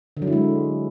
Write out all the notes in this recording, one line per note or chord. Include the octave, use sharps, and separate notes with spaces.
D3
F#3
E4
G#3